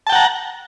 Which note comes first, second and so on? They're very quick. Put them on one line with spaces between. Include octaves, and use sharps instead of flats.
A5 G5 F#5 A#5